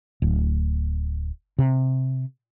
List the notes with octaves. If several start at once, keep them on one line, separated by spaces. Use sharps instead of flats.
D1
C3